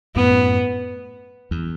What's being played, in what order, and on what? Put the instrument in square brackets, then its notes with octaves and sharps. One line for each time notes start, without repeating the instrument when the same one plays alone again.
[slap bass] F#2 A2 [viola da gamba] B3
[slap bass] E2